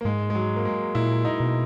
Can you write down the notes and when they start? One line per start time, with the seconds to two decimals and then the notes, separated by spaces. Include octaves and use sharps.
0.01 A#3
0.05 G#2 G#3
0.30 G#3
0.35 F#3
0.56 A#3
0.65 G#3
0.95 A#2 E4
1.25 D#4
1.40 B2